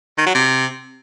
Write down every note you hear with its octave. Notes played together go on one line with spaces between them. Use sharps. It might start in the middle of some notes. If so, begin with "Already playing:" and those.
D#3
F#3
C3